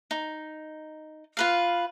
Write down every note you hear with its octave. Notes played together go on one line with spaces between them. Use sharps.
D#4
F4 B4 F5